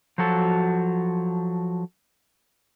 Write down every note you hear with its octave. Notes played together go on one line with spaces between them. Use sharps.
F3 F#3 F#4 A4